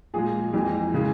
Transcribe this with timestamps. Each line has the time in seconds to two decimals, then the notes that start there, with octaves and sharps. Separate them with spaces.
0.14 A#2 F3 G#3 G#4
0.54 F2 E3 G#3
0.94 C#3 E3 G#3